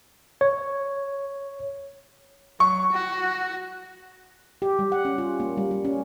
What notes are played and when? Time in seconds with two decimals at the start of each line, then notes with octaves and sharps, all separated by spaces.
0.41 C#5
2.60 F#3 C#6
2.92 F#4
4.62 G4
4.79 G3
4.92 F#5
5.05 C#4
5.18 F4
5.40 A#3
5.57 G3
5.71 G3
5.85 C#4